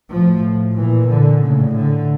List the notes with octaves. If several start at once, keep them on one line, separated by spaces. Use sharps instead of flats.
A2 F3
A#2 E3
D3
A2 C#3
D3